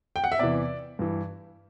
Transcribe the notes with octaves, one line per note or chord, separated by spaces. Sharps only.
G5
F#5
E5
E2 C3 E3 D5
G2 E3